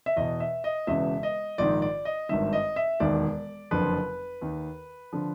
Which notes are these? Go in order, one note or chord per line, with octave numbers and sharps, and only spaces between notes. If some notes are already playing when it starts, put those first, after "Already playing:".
E5
E2 B2 D#5
E5
D#5
E1 E2 C#3 E5
D#5
A#1 G#2 D#3 D5
D5
D#5
G#1 G2 D#3 E5
D#5
E5
E1 D#2 D#3 D5
F#1 F2 D3 F3 B4
D#2 D#3
D3 F3